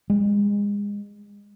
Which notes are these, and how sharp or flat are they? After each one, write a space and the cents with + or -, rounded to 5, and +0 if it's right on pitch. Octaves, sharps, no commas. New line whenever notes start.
G#3 -30